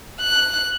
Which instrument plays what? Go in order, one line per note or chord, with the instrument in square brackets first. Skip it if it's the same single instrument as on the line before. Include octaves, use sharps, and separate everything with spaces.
[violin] F#6